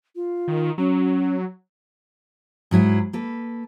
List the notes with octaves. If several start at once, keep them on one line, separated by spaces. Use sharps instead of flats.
F4
D#3
F#3 C#4
G#2 F#3 E4 G#4
A#3 A4 B4